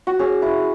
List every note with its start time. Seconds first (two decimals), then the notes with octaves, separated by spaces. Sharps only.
0.07 F#4
0.19 C#4 G#4
0.42 E4